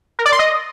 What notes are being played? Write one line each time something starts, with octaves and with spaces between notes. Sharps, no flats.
A#4
D5
C6
D#5